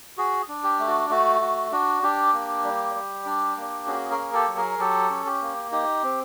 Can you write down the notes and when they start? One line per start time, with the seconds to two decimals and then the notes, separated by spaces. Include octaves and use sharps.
0.17 F#4 G#4
0.48 D4
0.64 G4
0.79 A3
0.87 F#4
1.10 A3 F#4
1.41 F#4
1.72 D4 F#4
2.03 D4 G4
2.33 A#3
2.64 G3
2.94 G3
3.26 D4
3.57 A#3
3.87 C#4 F#4 G#4
4.10 G#4 A#4
4.18 A#3
4.33 G4 A4
4.48 F#3
4.57 G#4 A#4
4.79 F#3 G4 A4
5.10 C#4
5.26 G4
5.42 A#3
5.72 D#4 G4
6.03 C4